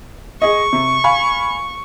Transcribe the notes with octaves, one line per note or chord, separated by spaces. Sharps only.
G#4 D#5 C#6
C3
F5 G#5 B5